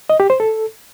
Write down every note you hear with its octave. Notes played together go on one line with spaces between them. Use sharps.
D#5
G4
C5
A4